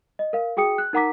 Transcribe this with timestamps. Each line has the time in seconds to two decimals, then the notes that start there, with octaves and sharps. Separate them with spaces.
0.19 D#5
0.33 A#4 F5
0.57 F#4 G#4 G5 D#6 C#7
0.78 F#6
0.93 D#4 A#4 F#5 A#5 D6 B6